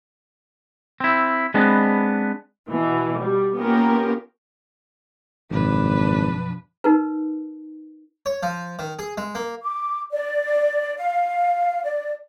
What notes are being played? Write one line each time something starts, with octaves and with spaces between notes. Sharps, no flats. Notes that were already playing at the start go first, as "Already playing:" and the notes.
C4 E4
G#3 B3 C4 D4 B4 D#5
B2 E3
G3
A#3 B3 C#4 F4 G4 A#4
G#1 F#2 B2 F3 D4 B4
D#4 A#4 B4
C#5
F3
D#3
G#4
G#3
A#3
D6
D5
F5
D5